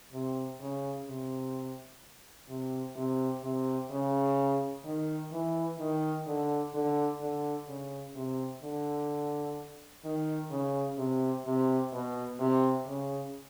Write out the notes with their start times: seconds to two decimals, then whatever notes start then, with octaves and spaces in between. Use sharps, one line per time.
0.12 C3
0.60 C#3
1.07 C3
2.49 C3
2.96 C3
3.43 C3
3.91 C#3
4.84 D#3
5.32 E3
5.79 D#3
6.27 D3
6.74 D3
7.21 D3
7.68 C#3
8.15 C3
8.63 D3
10.04 D#3
10.51 C#3
10.98 C3
11.45 C3
11.92 B2
12.39 C3
12.86 C#3